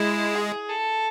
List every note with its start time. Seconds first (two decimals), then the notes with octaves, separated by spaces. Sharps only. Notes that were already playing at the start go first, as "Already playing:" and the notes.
Already playing: G#3 E4
0.35 G#4
0.68 A4